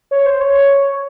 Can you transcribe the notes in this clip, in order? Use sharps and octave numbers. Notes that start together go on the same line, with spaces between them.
C#5
C5
C#5